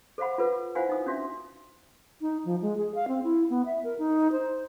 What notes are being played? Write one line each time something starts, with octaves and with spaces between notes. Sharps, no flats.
A4 C5 F5 F#5 B5
F4 A4 B4 F#5
E4 F4 C5 F5 F#5 G#5
D#4 D#6
C#4 D4 F#4 E5
D#4
F3
G#3
G#4
F5
C4
E4
B3
E5
A#4
D#4
C5